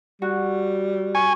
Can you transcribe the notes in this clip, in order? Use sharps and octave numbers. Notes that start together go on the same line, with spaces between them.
G3 F#4
G#5 C#6